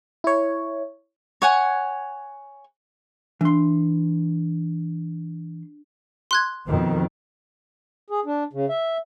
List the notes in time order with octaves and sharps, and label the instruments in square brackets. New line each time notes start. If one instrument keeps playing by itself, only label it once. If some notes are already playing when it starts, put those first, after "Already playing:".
[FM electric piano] E4 C#5
[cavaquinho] C#5 F#5 G#5
[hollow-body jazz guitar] E3 C6 [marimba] D4
[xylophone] C6 F#6 G#6
[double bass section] F2 B2 D#3
[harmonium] G#4
D4
C#3
E5